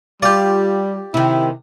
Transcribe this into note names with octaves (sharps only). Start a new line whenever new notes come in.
G3 F4 G4 D5
C3 D#3 E4